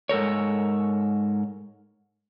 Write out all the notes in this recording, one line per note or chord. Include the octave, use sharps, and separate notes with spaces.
G#2 A4 A#4 C#5